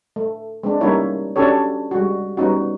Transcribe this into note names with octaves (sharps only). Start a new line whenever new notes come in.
A3
G#3 C4 D4
G3 A#3 C#4 D#4 E4 C#5
C#4 D4 F#4 G4 A4 C#5
G3 G#3 F#4
G3 B3 C#4 D#4 F#4